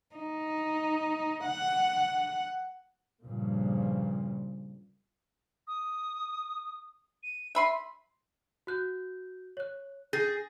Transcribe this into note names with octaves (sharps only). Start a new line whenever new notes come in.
D#4
F#5
G2 A#2 C#3 F3
D#6
D#7
E5 B5 C6
F#4 F#6 G6
C#5 F#6
G#4 G6 A6 A#6